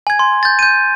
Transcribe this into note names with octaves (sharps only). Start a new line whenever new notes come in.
G#5 G#6
C6
G6 A6
G6 D#7